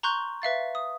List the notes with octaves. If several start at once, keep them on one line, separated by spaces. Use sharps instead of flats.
A#5 C6 C#6 F#6 G6
B4 E5 F5 A6
D#6